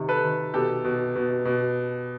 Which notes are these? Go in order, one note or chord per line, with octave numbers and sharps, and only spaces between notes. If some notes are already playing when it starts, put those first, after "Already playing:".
Already playing: C3 D#3
A4 B4
D#3
B2 G4 A4
B2
B2
B2